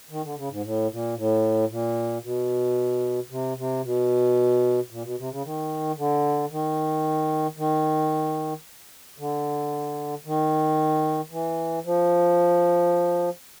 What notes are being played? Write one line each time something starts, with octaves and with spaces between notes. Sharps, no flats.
D#3
D3
C#3
G#2
A2
A#2
A2
A#2
B2
C3
C3
B2
A#2
B2
C3
C#3
D#3
D3
D#3
D#3
D3
D#3
E3
F3